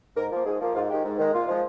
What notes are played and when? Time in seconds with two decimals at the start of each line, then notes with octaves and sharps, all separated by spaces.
0.17 G#2 A#4
0.31 F3 A#3
0.46 G#2 G#4
0.61 F3 A#3
0.75 G#2 F4
0.90 D#3 G#3 G4
1.05 G#2
1.19 D#3 G#3
1.33 A#2 F4
1.48 F3 G#3